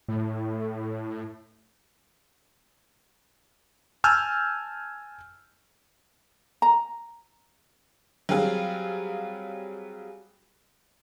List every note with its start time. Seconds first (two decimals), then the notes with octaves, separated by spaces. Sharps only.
0.08 A2
4.04 G#5 A5 E6 F6 G6
6.62 A#5
8.29 F#3 G3 C4 G#4 F5